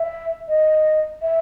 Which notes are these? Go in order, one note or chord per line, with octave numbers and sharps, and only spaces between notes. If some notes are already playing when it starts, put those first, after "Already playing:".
Already playing: E5
D#5
E5